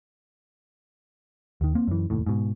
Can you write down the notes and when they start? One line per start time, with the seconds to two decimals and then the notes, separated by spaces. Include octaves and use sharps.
1.61 D#2 D#3
1.75 A#3 C4
1.88 F#2 E3
2.10 F1 D#2 A2
2.26 G#2 B2